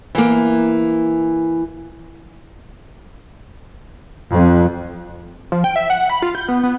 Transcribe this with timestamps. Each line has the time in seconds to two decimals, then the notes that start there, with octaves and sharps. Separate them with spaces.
0.15 E3 A#3
4.34 F2
5.52 F3
5.64 G5
5.76 E5
5.90 F#5
6.10 B5
6.22 F4
6.35 G6
6.48 B3
6.63 B3